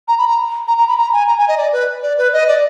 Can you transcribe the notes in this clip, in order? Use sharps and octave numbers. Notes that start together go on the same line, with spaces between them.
A#5
B5
A#5
A#5
A#5
B5
A#5
G#5
A#5
G#5
D#5
D5
B4
D5
B4
D#5
D5